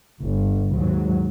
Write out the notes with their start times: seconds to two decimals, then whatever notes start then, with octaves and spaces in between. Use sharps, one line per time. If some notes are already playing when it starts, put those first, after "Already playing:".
0.21 G1
0.74 D#2 G#2 F#3